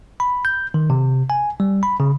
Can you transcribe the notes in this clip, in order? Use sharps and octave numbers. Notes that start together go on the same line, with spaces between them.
B5
G6
D#3
C3
G#5
G3
B5
C#3